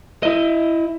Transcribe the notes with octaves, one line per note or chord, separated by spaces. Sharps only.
E4 D#5